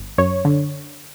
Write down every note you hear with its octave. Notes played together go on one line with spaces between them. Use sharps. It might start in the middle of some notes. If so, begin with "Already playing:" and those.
Already playing: G1
F#2 C#5
D3